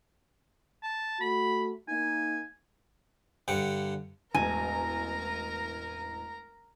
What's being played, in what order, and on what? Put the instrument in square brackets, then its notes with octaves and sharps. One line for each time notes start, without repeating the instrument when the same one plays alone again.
[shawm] A5
[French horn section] A3 F#4 [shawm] B5
[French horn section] A#3 D#4 [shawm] G#5
[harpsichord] G2 D3 F#5
[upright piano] E1 A1 [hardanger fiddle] A#4 A#5 [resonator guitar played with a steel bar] G#5